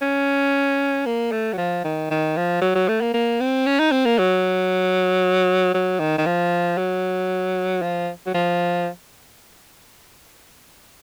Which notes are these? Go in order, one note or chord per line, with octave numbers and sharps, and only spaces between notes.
C#4
A#3
A3
F#3
F3
D#3
D#3
F3
F#3
F#3
A3
A#3
A#3
C4
C#4
D#4
C4
A#3
F#3
F#3
D#3
D#3
F3
F#3
F3
F#3
F3